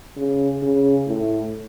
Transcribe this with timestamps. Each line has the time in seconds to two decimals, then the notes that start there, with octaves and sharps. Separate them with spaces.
0.17 C#3
0.63 C#3
1.07 A2